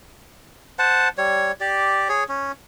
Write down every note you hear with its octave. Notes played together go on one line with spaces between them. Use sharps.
C5 F#5 A5
G3 C#5
G4 D5
G#4 C#5
C#4